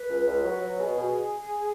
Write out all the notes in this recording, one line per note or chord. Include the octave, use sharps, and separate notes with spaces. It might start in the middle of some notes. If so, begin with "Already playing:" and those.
Already playing: B4
C#2
C#2
F#3
F#3
B2 G#4
B2